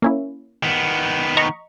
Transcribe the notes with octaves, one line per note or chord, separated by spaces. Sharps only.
A#3 C#4 E4
D#3 B3
D#5 A#5 C#6